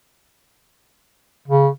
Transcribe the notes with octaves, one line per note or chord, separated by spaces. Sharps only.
C#3